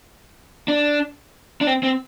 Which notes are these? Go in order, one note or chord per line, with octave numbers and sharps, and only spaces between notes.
D4
D4
C4
C4